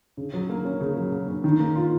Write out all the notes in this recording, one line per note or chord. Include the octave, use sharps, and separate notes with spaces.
C#3
F#3
A#3
C#4
C#3
F#3
A#3
C#4
D#3
A#3
F4